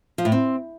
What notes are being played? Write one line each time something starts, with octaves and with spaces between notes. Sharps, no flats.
F3
A2
C4